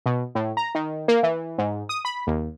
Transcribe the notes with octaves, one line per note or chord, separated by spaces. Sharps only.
B2
A2
A#5
D#3
A#3
E3
G#2
D#6
B5
D#2